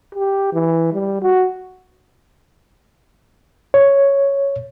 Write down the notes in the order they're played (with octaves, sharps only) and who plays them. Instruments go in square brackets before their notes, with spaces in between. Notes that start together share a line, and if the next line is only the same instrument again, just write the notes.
[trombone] G4
E3
G3
F#4
[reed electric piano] C#5